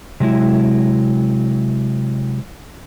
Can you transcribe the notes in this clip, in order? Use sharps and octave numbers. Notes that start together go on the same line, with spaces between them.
C3 F#3 G#3 E4